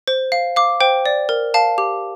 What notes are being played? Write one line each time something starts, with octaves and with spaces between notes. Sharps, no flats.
C5
F5
F5 D6
C5 G5
D5
A#4
F5 A5
G4